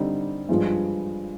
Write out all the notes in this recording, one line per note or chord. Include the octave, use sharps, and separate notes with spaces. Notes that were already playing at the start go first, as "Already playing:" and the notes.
Already playing: D3 G3 C4 D#4
G2 F3 G#3